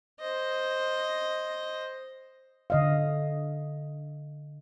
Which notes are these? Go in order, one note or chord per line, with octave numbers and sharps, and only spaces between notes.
C5 D#5
D3 D#5 F5